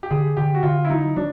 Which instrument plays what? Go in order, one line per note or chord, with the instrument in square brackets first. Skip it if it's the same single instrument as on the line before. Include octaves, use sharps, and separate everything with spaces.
[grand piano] G4
[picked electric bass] D3 [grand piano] G#4
[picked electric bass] D3 [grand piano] G4
[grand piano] F#4
[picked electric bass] D3 [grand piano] F4
[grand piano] E4
[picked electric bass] F#3 [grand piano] D#4
[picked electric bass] F#3 [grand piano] D4